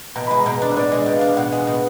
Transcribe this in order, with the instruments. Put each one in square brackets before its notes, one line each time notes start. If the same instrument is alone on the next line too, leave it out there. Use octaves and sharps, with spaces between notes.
[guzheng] B2 [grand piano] A#5
[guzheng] G#3 [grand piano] B5
[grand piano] A#5
[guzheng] B2
D4
[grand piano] B4
[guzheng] B2 [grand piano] D5
[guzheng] G#3 [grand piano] D#5
[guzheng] B2
[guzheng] D4 [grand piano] F5
[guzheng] B2 [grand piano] F#5
[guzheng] G#3
B2